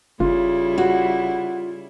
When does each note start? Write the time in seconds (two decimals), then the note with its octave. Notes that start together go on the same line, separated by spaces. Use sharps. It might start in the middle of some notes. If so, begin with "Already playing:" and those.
0.20 F#1 C#3 G3 E4 F4
0.78 F#4